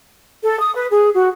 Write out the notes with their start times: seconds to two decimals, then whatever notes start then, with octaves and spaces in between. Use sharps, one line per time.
0.43 A4
0.61 D#6
0.75 B4
0.90 G#4
1.14 F#4